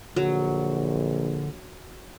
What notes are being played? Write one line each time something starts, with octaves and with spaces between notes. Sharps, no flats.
A#1 D3 F#3